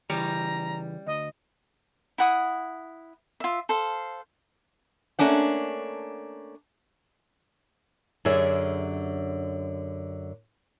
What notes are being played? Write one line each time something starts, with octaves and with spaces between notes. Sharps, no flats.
C#3 E3 G3 C#4 A#5
D2 D#5
E4 F#5 D#6
F4 E5
A4 C5 F5
A3 A#3 C#4 D4 F#5
F#2 D3 G4 G#4 E5